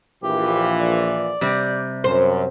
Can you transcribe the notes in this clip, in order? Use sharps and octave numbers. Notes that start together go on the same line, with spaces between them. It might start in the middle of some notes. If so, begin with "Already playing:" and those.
A#1 E3 F4 G4
D5
C3 G3
F#2 C5